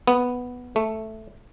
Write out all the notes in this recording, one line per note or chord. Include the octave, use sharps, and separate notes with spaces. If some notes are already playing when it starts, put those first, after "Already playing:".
B3
A3